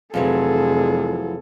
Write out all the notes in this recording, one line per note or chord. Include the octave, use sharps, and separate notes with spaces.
F1 F2 E3 F#3 G#4 A4